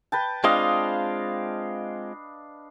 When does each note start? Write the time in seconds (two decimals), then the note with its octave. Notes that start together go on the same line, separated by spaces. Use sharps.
0.12 B4 G5 A5
0.44 G#3 C4 D4 F4 D#5 F5